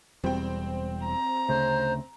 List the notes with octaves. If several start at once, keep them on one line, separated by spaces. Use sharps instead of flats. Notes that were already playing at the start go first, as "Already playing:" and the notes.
E1 E2 G3 C4 G5
A#5
D2 C#3 A3 C5